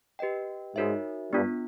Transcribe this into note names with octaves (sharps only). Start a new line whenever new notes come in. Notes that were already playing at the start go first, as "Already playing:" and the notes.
G4 B4 D#5 G5
G#2 G#3 D#4 F#4 A#4 C#5 E5
G2 G3 B3 D4 F4